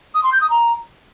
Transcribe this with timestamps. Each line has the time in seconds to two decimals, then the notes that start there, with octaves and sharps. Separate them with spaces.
0.15 D#6
0.24 C6
0.32 G6
0.41 D#6
0.50 A#5